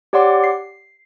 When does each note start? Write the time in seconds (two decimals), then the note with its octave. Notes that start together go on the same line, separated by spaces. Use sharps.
0.13 G4 C#5 D5 F#5 C6 D6
0.44 C7